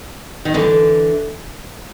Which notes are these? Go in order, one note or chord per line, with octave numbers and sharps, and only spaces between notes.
D#3
D3 E3